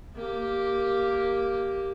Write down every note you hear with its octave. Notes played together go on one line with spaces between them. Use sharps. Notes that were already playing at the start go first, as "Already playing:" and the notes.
A#3 G4